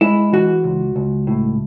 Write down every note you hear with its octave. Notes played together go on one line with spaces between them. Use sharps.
G#3 E4
E3 F#4
C#2
C#2
A2